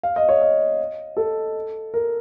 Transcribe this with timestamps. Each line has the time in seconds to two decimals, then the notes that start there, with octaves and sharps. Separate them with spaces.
0.03 F5
0.16 D#5
0.29 C#5
0.42 D#5
1.17 A4
1.94 A#4